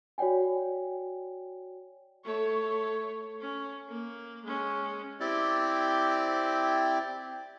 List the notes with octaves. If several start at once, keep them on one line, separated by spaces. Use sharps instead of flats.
F#4 C#5 D5 G5 G#5
A3 C#5
C#4
A#3
G#3 C#4
C4 E4 G4 D5